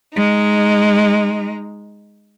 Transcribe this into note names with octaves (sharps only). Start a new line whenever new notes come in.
G#3 D#4